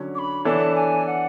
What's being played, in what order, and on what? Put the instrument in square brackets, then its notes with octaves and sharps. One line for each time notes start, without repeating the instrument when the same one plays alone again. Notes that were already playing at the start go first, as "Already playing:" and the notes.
Already playing: [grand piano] D3 F#3 C#4
[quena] D6
B5
[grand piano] E3 B3 D4 A4 C#5 [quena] A5
[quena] G#5
F#5